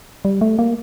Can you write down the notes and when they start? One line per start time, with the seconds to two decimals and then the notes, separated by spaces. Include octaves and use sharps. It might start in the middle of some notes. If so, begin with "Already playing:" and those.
0.25 G3
0.41 A3
0.59 A#3